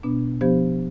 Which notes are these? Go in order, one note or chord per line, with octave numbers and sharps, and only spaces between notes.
B2 B3 D4
F3 B3 D4 G4 C5